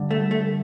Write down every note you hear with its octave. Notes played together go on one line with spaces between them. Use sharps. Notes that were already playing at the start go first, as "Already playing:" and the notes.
Already playing: G2 D3
A3
A3